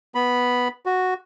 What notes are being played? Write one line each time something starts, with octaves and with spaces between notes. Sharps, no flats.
B3 B5
F#4